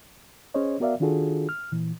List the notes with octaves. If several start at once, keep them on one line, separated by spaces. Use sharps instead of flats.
C#4 G#4 C5 C#5 D#5
B3 F#4 A#4 D5 E5 F5
D#3 D4 F4 F#4 G#4 A4
F6
A#2 E3